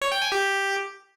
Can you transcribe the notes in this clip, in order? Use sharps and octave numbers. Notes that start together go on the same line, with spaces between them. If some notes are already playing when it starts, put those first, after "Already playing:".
C#5
G5
G#5
G4